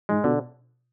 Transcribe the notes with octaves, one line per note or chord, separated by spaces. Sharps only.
G#2 G#3
B2 D3